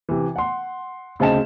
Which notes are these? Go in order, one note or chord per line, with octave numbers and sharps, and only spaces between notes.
C3 E3
F#5 C6
D2 C#3 C4 D#5 A5 E7